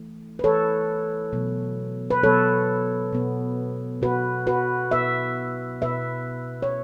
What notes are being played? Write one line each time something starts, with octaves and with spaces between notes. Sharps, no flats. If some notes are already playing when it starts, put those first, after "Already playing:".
Already playing: E3 A3
B4
E3 A3 A4 C#5
B2 F#3 B3
B4
B2 F#3 B3 A4 C#5
B2 B3
B2 B3 F#4 B4
F#4 B4
B2 B3 B4 E5
B2 B3 B4 E5
C#5